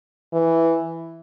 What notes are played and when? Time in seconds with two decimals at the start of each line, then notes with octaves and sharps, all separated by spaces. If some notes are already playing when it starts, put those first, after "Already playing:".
0.33 E3